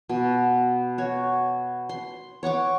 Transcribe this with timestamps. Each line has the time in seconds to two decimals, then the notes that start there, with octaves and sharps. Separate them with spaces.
0.09 B2
0.98 F#4 C#5
1.89 C6
2.43 C#5 F#5 C#6 D6